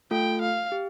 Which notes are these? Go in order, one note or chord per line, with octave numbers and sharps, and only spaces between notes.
A3 F4 A4 G5
F5
G4